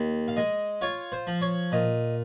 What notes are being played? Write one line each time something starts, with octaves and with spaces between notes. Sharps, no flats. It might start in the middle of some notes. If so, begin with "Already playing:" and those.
Already playing: D#2
F5
G#3 D#5
F4 C#5
C5
F3
C#5
A#2 D#5